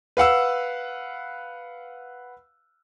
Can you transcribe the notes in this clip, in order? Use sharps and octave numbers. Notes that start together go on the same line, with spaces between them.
B4 F5 F#5 E6